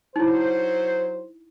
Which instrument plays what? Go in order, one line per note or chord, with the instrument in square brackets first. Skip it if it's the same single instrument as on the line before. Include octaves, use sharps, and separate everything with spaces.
[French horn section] F#3 C5 [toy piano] D#4 E4